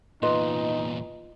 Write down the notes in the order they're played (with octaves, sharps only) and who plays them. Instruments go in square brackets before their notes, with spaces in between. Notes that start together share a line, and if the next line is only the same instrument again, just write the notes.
[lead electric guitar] E2 A#2 [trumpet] D#4 [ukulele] F4 B4 D#5